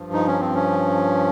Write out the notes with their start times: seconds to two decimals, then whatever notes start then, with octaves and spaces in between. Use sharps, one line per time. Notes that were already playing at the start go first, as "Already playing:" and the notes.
Already playing: G2 F3
0.13 D#4
0.27 C#4
0.40 C4
0.55 C#4